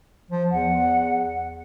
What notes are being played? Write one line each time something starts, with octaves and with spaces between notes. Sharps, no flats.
F3
E2 F#5